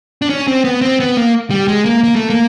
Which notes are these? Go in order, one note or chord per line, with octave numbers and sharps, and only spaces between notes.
D4
C#4
C4
B3
C4
B3
A#3
G3
G#3
A#3
A#3
A3
A#3